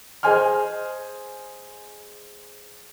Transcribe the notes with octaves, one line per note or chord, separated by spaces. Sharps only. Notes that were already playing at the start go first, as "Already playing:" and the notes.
G#4 C5 D#5 G#5 C6 F6